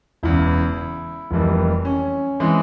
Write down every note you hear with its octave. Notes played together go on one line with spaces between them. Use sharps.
E1 E2 C#3 E4
F1 F2 E3 G3 A#3
C#4
E3 G#3 C4